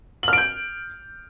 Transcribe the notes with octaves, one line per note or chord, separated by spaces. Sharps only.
F6 G6 D7 F#7